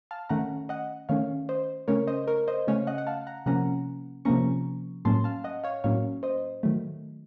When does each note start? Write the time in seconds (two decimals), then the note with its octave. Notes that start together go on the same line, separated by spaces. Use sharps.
0.11 F5 A5
0.29 D#3 A3 C#4 F#5 A#5
0.69 D#5 F#5
1.09 D#3 A3 C#4 C#5 F5
1.49 C5 D#5
1.88 C#3 A3 C#4 A#4 C#5
2.07 C5 D#5
2.28 A#4 C#5
2.48 C5 D#5
2.67 C#3 A3 C#4 C#5 F5
2.87 D#5 F#5
2.98 F#5
3.07 F5 A5
3.27 F#5 A#5
3.46 C3 F3 A#3 C#4 F#5 A#5
4.25 C3 F3 A#3 C#4 A#5 C#6
5.05 A2 F#3 A#3 C#4 A5 C6
5.24 F5 A5
5.44 D#5 F#5
5.64 C#5 F5
5.84 A2 F#3 A#3 C#4 C#5 F5
6.23 C5 D#5
6.63 D#3 F#3 A3